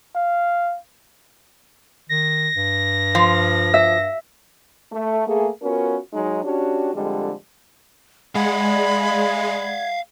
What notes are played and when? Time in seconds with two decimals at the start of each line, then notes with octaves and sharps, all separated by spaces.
0.15 F5
2.09 D#3 A#6
2.56 G2
3.15 F3
3.74 E5
4.92 A3
5.26 A3 A#3 G#4
5.62 B3 C#4 F4 F#4 A#4
6.13 F#3 G#3 D#4
6.44 C#4 D4 F#4 G4
6.94 F2 D3 G3 G#3
8.35 G#3 D5 F5 F#5 B5 G#6